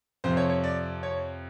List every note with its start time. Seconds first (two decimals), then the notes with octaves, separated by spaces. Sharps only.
0.24 F2 C3 F3 C5
0.37 C#5
0.50 C#5
0.64 D5
1.03 C#5